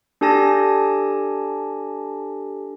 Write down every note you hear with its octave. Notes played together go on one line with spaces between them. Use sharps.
D4 G4 A4 G#5 A5 A#6